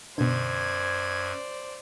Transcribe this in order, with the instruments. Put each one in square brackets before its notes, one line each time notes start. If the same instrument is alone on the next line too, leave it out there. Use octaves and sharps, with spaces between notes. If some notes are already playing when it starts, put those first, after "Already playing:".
[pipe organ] F#2 G#6 [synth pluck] B2 D3 [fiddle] C5 D5